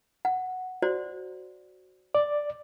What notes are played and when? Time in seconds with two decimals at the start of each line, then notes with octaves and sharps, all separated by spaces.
0.25 F#5
0.82 F#4 C5 D5
2.15 D5